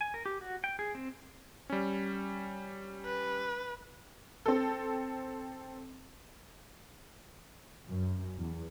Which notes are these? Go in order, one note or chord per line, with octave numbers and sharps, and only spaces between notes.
G#5
A#4
G4
F#4
G5
G#4
C4
G3 C#4
B4
C4 A4
F#2
E2